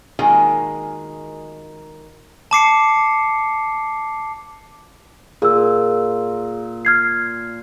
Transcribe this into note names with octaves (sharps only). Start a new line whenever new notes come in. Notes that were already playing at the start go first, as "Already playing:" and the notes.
D#3 G#3 A#3 F4 F#4 G#4
A5 D6 C7 C#7
A#2 G#4 E6
F6 G#6 C7